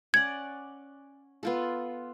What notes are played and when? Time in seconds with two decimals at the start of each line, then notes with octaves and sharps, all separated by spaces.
0.14 C#4 D5 F#5 G#6
1.43 B3 F4 A4